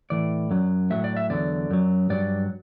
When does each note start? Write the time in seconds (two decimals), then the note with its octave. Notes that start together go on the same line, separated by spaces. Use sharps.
0.10 A2 E3 D5
0.51 F#2 F#3
0.90 A2 F#3 E5
1.04 D5
1.17 E5
1.30 E2 D3 F#3 D5
1.71 F#2 F#3
2.10 G2 F#3 D5